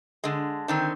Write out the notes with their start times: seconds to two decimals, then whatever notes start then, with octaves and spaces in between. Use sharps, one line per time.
0.24 D3 G#3
0.68 D3 D#3 C4